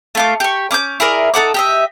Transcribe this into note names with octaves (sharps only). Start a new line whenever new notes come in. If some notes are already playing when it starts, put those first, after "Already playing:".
A3 F4 D6
G4 C#6
C#4 D6 D#6 G6
E4 G#4 A#4 D5
D#4 A4 F#5 D6
G4 D#5 E5